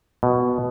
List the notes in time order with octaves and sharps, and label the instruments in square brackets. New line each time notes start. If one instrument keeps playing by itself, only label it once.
[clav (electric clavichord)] B2